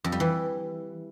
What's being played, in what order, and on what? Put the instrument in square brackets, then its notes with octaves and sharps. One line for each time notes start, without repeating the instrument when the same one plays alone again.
[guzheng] F2
G3
E3